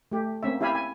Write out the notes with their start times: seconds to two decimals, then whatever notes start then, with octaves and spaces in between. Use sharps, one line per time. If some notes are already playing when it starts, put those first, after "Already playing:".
0.12 A3 G4
0.43 A#3 C4 C#4 E5
0.61 E4 G4 E5 F5 G#5 B5
0.75 G#5